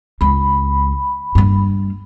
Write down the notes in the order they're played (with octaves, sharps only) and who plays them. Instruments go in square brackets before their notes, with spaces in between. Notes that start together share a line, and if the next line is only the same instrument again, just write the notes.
[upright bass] C#2 G#3 [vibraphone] B5
[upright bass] G2 A#3